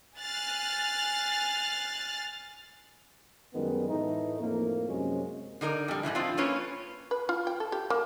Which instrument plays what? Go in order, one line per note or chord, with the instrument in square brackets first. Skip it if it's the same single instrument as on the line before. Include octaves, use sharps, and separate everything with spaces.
[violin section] G#5 F6 F#6 A6 C7
[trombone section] F#2 D#3 G3 G#3 B3
A2 E3 A3 D#4
F2 A2 A#3
F#2 C3 G#3 C#4
[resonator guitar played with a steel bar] D3 D#4 A#4 D5
F2 G3
G#2 C#3 E3 E4
F3 C4 D4 F4
A#3 C#4 F4 B4 C#5
[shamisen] B4
F4
G5
A4
G4
A#3